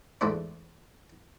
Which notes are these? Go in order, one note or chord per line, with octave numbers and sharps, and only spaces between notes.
E2 G#2 A3 D4 E4 C5